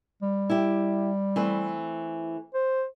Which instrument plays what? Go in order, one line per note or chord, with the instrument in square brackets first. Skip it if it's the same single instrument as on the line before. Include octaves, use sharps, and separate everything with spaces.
[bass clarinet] G3
[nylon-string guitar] E4 G4
E3 A3 C4
[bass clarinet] C5